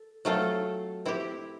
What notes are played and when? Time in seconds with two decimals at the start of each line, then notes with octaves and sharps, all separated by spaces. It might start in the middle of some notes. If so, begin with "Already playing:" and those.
Already playing: A4
0.25 F#3 A3 C4 F4 A4
1.05 C4 E4 G4